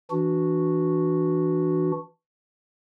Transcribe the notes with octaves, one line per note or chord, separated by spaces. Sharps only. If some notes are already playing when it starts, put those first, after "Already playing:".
E3 D4 F#4